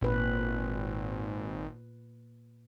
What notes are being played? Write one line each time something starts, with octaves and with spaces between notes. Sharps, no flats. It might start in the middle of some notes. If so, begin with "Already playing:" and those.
G#1 A#2 B4